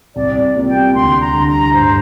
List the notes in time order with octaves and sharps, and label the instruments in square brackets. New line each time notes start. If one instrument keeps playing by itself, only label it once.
[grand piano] C2 [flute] D5
[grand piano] C3 G3 A#3 F4
[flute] G5
[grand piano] D2 [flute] C6
[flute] A#5
[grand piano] D3 G3 D4
[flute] A#5
[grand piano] G2 [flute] C5